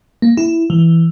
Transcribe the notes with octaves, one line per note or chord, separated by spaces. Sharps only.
A#3
E4
E3